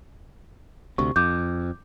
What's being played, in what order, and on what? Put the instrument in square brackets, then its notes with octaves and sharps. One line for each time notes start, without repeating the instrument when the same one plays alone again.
[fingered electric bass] D2 C3 [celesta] C#6
[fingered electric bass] F2 [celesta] D6 G6